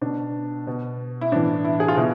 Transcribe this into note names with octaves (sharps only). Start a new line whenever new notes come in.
B2 D4
B2
E4
A2 E3 D4
E4
G#4
F4
B2 E4